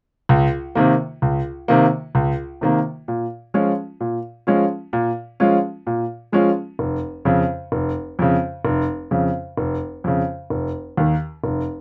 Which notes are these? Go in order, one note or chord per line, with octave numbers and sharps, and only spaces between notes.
C#2
C3 D#3 A#3
C#2
C3 D#3 A#3
C#2
C3 D#3 A#3
A#2
F3 G#3 C#4 F4
A#2
F3 G#3 C#4 F4
A#2
F3 G#3 C#4 F4
A#2
F3 G#3 C#4 F4
F1
F2 C#3
F1
F2 C#3
F1
F2 C#3
F1
F2 C#3
F1
D#2 D#3
F1